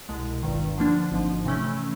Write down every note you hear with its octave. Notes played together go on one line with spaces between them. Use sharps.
C2 B2 G#3
G1 G2 D#3
D3 F3 A#3 D4
G#1 G#2 F3
C3 E3 A3 C#4